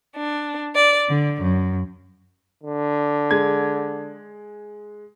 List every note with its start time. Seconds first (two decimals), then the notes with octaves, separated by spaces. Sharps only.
0.16 D4
0.75 D5
1.10 D3
1.42 F#2
2.63 D3
3.31 G#3 G#6